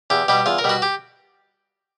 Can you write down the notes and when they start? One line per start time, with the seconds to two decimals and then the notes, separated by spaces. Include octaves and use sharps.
0.10 E2 G4
0.28 B2 G3 G4
0.46 E2 F4
0.58 A#4
0.64 B2 G3
0.69 F#4
0.82 G4